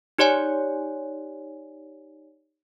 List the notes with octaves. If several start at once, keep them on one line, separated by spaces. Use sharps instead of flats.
D#4 G4 C#5 D5 G#5